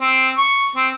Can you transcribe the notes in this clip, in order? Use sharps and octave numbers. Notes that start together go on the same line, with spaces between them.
C4
C#6
C4